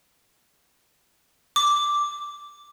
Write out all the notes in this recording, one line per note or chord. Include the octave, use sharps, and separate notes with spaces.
D6